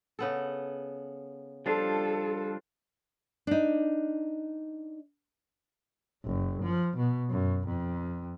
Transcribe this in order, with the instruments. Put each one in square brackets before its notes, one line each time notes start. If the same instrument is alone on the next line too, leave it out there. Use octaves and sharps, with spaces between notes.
[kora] C#3 B3 A4
[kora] F3 [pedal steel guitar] G3 D4 F4 [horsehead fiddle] A4
[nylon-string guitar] D4 D#4
[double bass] F#1
F3
B2
F#2
F2